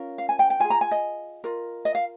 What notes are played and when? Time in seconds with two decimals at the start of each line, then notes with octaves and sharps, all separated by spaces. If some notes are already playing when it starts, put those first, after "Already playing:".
Already playing: C#4 F4 A#4
0.18 F5
0.29 G#5
0.39 G5
0.50 G5
0.60 F4 G#4 G#5
0.70 A#5
0.81 G#5
0.91 D#5
1.44 F4 A#4
1.85 D#5
1.95 F5